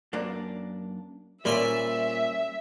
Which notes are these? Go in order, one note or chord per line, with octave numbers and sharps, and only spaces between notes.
F#2 A#3 D4
A#2 G3 A#3 C#4 C5 D5 E5